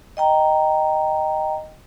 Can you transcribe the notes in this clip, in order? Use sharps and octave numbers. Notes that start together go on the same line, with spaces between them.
D#5 G5 A#5